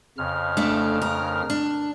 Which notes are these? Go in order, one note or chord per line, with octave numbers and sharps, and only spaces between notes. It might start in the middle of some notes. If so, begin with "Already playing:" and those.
F2 C#3 F6
A3 D4
A#4
D4